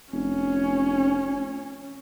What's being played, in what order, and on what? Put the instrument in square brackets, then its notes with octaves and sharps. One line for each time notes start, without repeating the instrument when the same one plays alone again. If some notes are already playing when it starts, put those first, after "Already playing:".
[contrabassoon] F1 [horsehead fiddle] C#4